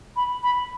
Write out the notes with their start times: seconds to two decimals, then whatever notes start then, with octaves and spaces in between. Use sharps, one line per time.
0.16 B5
0.43 B5